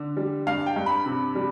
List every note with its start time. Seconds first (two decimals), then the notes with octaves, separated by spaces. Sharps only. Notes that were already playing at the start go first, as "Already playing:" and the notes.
Already playing: D3
0.17 G3
0.47 G2 F5
0.66 G5
0.76 G2
0.86 B5
1.06 C3
1.35 G3